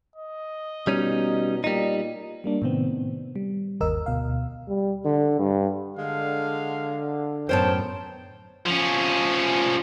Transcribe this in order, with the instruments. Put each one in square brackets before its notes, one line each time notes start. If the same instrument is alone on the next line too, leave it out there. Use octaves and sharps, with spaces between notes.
[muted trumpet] D#5
[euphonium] B2 [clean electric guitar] G3 C#4 D#4
[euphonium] A#2 [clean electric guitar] G3 D#4
[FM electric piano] G3 A#3 D4
A2 C3 D#3 B3 C4
G3
G1 D#2 A#4 D#5 E6
D2 B2 F5
[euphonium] G3
D3
G2
[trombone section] D3 [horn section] G#3 F5
[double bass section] F#2 A2 B3 [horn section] A#4 G5 [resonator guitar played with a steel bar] C5 C#5 A5
[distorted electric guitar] F3 C#4